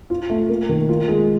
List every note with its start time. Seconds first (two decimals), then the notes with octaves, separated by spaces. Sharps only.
0.10 F4
0.30 A3
0.49 A#3
0.69 D#3
0.89 F4
1.08 G#3